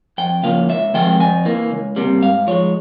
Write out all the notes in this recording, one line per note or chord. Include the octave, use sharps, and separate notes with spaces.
F2 G5
C#3 F3 A#3 F5
C#2 E5
C3 F3 G#3 G5
F2 G#5
E3 A#3
C#2
C3 G3 A#3
G#2 F5
F3 G#3 C#5